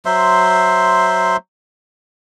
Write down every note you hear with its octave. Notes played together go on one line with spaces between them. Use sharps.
F#3 C5 E5 C6